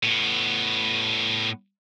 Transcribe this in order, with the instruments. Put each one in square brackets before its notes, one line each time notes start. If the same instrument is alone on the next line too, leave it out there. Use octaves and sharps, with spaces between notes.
[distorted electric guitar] A2 B3